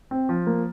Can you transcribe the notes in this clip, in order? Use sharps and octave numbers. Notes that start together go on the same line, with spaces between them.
C4
F3
A#3